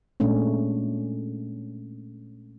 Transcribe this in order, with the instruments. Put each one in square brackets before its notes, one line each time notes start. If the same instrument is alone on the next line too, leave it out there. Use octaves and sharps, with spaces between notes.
[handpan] A#2 G#3 A3 C#4 D4